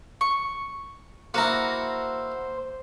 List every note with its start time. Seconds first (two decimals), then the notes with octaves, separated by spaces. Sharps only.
0.21 C#6
1.34 A#3 E4 F#4 C5 A#5